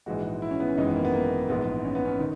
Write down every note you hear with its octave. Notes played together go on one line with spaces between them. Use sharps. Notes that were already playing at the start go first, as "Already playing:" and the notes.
A#1 G#2 E3 G#3 F#4
E4
C#4
B3
C#4
G#1 F#2 E3 G#3 D#4
B3
A#3
B3
A#3
A#1 G#2 E3 G#3 B3
C#4
B3
C#4
D#3